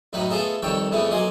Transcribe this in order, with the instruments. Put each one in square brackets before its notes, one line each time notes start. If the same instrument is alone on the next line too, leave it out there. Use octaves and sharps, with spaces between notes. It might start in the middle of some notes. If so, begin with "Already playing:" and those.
[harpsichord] F#2 A2 F#3 D#4 B4
A3 B3 F4 G#4 A4 D#5
C2 F2 D#3 A4 C#5 G5
F2 C#3 E3 A3 B3 C#4
B1 F#3 A#3 D#5 G#5 C6